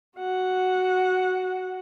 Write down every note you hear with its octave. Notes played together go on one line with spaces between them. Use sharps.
F#4 F#5